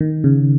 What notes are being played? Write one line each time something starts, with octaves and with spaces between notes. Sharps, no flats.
D#3
C#3